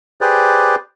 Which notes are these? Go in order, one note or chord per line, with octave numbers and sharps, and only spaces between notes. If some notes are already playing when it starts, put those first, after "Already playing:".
G4 G#4 B4 C5 D5